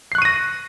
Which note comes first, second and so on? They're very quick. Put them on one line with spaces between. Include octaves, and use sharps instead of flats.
C7 F#6 C#6 D#7 A#6